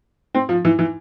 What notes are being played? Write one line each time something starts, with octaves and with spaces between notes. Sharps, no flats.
C4
F3
E3
E3